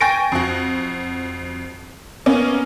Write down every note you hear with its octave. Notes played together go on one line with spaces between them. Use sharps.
G5 G#5 C#6 A6 A#6 D7
F2 F#4
A#3 B3 C#4